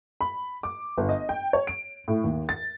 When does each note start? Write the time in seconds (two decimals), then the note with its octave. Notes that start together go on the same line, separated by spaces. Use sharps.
0.21 B5
0.63 D6
0.98 G1
1.09 D#5
1.29 G5
1.53 C#5
1.67 D7
2.08 A2
2.24 D#2
2.49 A6